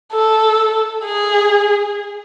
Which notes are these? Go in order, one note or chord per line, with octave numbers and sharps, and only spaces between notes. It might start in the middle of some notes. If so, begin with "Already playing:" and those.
A4
G#4